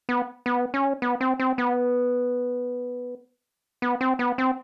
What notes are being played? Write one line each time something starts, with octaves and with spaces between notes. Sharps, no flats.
B3
B3
C#4
B3
C4
C4
B3
B3
C4
B3
C4